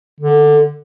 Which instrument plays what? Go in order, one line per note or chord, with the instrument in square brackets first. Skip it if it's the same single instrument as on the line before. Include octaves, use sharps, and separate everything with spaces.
[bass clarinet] D3